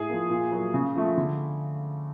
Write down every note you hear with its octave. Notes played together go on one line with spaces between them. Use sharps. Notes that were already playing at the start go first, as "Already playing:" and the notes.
Already playing: A2 G#4
F3 A#3
A#2
F#3 A#3
C#3
F3 A3
D3